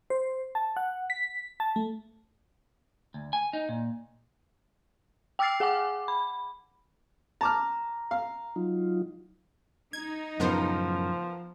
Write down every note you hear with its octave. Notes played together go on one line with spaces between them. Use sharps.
C5
A5
F#5
B6
A5
A3
D2
G#5
D#4
A#2
G5 D6 E6 F6 A6 C7
G#4 F#5 G#5 D6
B5
A5 A#5 D6 F6
F5
F#3 D#4 F4
D#4 G#6
F#2 A2 C#3 F3 B3 A#4 C5